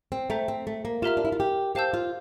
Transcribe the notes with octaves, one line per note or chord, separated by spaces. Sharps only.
C4
A3 C5 E5 G5 A#5
C4
A3
A#3
F4 G4 A#4 E5 A#5 F6
D4
E4
F4
G4
G4 C5 F5 A5 E6 G6
F4